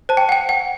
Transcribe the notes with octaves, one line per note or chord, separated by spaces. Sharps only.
C5 A5
G5
F#5 G5
F#5